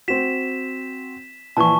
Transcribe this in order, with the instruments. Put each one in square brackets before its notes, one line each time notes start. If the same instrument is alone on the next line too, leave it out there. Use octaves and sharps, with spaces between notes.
[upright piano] C4 F#4 [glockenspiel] B6 E7
[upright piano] A#2 E3 F3 [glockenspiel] A5 C#6